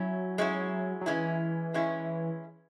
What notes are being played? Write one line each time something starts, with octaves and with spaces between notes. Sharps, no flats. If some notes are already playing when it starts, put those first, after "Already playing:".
Already playing: F#3 C#4 E4
G#3 C#4 E4
F#3
E3 G#3 C#4 E4
G#3 C#4 E4